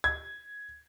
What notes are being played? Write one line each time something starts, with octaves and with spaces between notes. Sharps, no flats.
G#6